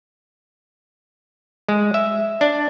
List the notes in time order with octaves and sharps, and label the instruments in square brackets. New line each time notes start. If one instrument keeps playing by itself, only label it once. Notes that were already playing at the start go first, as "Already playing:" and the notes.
[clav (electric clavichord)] G#3
E5
D4